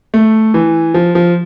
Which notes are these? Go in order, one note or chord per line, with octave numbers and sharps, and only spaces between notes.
A3
E3
F3
F3